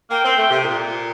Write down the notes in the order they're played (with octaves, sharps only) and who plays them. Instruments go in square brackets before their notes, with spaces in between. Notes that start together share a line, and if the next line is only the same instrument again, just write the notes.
[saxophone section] A#3 [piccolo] G5
[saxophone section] C4
A3
C3
A#2